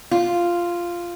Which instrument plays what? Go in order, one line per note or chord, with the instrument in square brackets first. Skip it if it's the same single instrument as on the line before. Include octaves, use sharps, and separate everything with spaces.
[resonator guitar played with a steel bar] F4